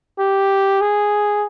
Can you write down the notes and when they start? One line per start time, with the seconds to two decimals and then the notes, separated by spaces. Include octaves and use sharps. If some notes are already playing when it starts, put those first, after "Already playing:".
0.19 G4
0.81 G#4